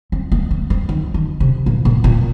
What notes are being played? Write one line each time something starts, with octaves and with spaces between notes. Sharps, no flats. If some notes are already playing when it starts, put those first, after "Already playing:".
C4
A#3
C4
C4
D#3
D#3
C3
A#2
A#2
A#2